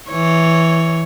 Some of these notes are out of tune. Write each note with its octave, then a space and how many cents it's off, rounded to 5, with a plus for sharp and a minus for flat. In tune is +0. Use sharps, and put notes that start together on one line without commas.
E3 +0 C#5 +0